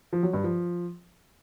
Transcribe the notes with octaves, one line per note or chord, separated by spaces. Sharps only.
F3
F#3
G2
F3